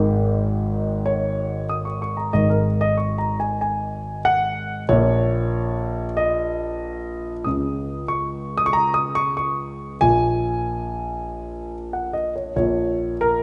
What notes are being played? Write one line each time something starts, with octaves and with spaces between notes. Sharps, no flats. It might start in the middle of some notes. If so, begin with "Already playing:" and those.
Already playing: G#1 G#2 D#3
C#5
D#6
C#6
C#6
A#5
G#1 G#2 D#3 D#5
A#4
D#5
C#6
A#5
G#5
G#5
F#5
A#1 A#2 C#5
D#5
C#2 C#3 D#6
C#6
D#6
C#6
A#5
D#6
C#6
C#6
A#1 A#2 G#5
F#5
D#5
C#5
A#1 A#2 C#5
A#4